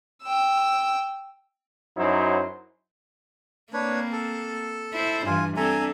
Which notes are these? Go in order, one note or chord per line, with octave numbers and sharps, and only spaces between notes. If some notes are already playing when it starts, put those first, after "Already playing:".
G5 E6
F#2 F#3 D#4 E4 C5
A#3 C4 D4 B4 C#5
A4 A5
E4 C5
G2 E3 F4 G#5
C4 D4 A4 E5 G#5 A#5